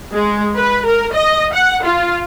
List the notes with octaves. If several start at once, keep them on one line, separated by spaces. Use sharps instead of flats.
G#3
B4
A#4
D#5
F#5
F4